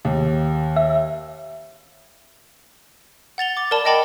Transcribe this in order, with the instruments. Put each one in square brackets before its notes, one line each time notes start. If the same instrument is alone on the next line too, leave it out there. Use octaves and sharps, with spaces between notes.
[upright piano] D#2
[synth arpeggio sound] E5
[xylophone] F#5 A6 F7 G7
D6 A6
A#4 D5 A5 B5
D#5 F#5 G5 A5 B5 D6